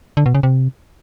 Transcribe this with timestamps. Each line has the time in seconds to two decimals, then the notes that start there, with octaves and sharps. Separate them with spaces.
0.17 D3
0.26 B2
0.35 C#3
0.43 C3